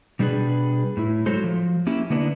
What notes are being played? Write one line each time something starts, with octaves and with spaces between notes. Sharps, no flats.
B2 G3 A3 D4 G#4 B4
A2 E4
F#3 G#3 A4 C5
F3
A#3 C#4 E4 G4
D3 A#3 B3 D4 E4